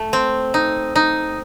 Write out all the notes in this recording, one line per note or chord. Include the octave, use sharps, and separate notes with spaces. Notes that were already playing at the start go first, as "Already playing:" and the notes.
Already playing: A3
C4
D#4
D#4